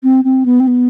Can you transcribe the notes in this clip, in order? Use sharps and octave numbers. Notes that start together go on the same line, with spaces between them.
C4
C4
B3
C4
B3